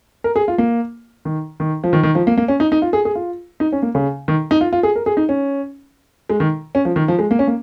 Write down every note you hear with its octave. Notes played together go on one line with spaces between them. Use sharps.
A#4
G#4
F4
A#3
D#3
D#3
F3
D#3
D#3
F3
A#3
A#3
C#4
D#4
D#4
F4
G#4
G#4
F4
D#4
C#4
A#3
C#3
D#3
D#4
F4
F4
G#4
A#4
G#4
D#4
C#4
G#3
D#3
C#4
F3
D#3
F3
G#3
A#3
C#4
A#3